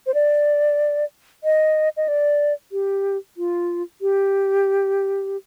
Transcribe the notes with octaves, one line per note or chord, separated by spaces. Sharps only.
C5
D5
D#5
D#5
D5
G4
F4
G4